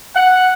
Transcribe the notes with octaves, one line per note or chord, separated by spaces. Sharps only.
F#5